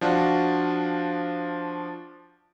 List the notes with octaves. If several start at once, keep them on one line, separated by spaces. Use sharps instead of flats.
F3 D4 F4 F#4